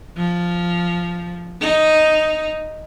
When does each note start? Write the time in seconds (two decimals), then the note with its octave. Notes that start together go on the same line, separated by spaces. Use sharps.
0.17 F3
1.61 D#4